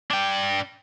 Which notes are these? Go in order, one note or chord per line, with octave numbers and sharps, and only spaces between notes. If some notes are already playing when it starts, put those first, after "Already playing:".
D4 G5